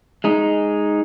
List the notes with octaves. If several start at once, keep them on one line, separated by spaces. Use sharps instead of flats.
G#3 D#4